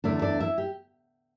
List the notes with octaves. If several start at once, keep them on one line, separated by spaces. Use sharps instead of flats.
E2 D3 A3 D4 E4 D5
D4 D5
E4 E5
G4